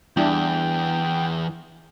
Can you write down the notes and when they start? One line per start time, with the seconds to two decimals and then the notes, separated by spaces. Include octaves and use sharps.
0.17 E2 G3 D4 E4 G5